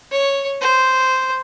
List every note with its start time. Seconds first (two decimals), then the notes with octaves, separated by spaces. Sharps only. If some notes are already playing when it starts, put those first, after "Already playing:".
0.12 C#5
0.61 C5